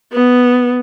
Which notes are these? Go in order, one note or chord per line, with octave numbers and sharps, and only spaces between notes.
B3